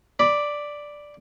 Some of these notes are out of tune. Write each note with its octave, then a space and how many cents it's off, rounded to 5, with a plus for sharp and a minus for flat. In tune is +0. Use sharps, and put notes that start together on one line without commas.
D5 +0 B5 +0